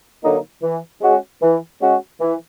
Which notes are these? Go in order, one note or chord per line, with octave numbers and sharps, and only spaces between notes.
D3 F#3 A#3 D#4
E3
G#3 C#4 F#4
E3
G#3 C#4 F#4
E3